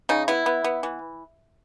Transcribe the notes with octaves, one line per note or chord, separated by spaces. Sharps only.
C#3 D#4
B3 E4
B3
B3
E3